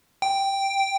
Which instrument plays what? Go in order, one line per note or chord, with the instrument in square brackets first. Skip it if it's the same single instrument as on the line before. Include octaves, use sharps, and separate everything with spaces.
[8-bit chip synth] G5